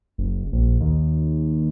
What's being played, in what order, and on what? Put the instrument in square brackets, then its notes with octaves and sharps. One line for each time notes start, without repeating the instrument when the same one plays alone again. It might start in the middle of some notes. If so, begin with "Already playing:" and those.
[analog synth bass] F#1
A#1
D#2